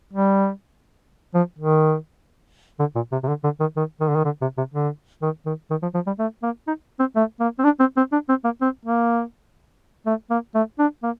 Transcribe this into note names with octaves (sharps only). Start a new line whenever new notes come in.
G3
F3
D#3
D3
A#2
C3
C3
D3
D3
D#3
D#3
D#3
D3
D#3
D3
C3
C3
D3
D#3
D#3
D#3
F3
F3
G3
A3
A#3
D#4
C4
A3
A#3
C4
D4
C4
C4
D4
C4
A#3
C4
A#3
A3
A#3
A3
D4
A#3